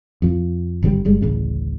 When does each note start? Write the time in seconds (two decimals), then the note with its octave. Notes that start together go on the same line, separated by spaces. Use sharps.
0.22 F2 F3
0.83 G#1 D3 E3 G3
1.05 G1 G3 G#3
1.22 D1 A1 C#3